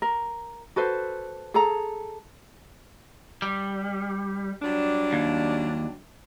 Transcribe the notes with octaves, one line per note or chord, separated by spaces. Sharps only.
A#4
F#4 A4 B4 C5
G#4 A4 A#5
G3
F#3 G3 D4
D#2